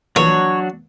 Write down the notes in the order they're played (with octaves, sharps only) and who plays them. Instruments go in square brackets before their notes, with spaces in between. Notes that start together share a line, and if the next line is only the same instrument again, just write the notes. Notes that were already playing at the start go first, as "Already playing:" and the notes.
[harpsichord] A#1 E3 A#3 [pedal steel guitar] F#3 D4 F#4 [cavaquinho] C#5